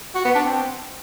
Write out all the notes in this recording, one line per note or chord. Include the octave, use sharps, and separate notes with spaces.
F#4
B3
D4
C4